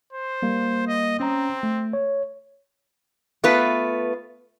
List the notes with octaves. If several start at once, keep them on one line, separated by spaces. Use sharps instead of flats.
C5
G3 A#3
D#5
C4 C#4 A#5
A3
C#5
A3 B3 F4 B4